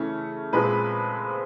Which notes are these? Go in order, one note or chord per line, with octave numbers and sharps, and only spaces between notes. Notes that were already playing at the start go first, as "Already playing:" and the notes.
Already playing: C#3 E3 A3 C#4
A#2 F3 G#3 C4 B4